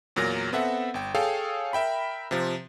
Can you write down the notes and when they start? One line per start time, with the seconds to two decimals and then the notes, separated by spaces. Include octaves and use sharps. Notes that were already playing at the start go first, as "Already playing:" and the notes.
0.16 E2 A#2 F#3 A#4 A#6
0.53 B3 C4 A4 E5 F#5
0.94 G1 G5
1.15 G#4 A4 C#5 F5 G5
1.73 A#4 E5 G5 B5
2.31 C3 F3